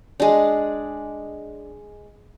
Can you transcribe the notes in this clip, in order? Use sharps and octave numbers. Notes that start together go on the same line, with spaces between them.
G#3 D4